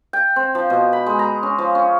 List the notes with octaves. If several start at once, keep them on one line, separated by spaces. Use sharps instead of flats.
G5
C4
F3
B2
B5
G#3
A#5
C#4
F3
C#4